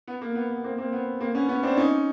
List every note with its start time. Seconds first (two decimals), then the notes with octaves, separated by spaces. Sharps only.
0.07 B3
0.21 A#3
0.35 B3
0.50 B3
0.64 A#3 C4
0.78 A#3 C4
0.93 B3
1.20 A#3 C4
1.35 B3 C#4
1.49 B3 C#4
1.63 C4 D4
1.77 C#4 D#4